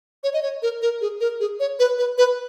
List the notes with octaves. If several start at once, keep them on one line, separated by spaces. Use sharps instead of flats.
C#5
D#5
C#5
A#4
A#4
G#4
A#4
G#4
C#5
B4
B4
B4